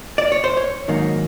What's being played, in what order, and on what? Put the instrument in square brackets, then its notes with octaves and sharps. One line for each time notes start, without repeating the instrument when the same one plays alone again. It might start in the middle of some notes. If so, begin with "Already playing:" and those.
[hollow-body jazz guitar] D5
C#5
C5
C#5
G#2 D#3 F#3 A#3